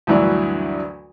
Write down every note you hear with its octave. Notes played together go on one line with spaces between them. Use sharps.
D2 G2 E3 F#3 D4